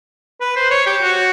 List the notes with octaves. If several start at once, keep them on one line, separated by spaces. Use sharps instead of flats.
B4
C5
C#5
G4
F#4